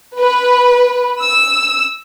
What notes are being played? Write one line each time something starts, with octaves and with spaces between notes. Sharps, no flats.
B4
E6